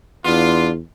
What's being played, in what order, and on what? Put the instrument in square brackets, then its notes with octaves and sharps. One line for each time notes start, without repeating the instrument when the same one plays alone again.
[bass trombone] E2 [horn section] B3 D4 F4